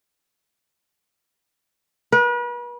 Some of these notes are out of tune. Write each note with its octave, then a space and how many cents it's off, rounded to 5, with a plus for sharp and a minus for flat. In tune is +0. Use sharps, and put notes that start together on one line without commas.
B4 -40